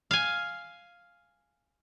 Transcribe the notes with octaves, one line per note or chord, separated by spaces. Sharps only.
F5 G#5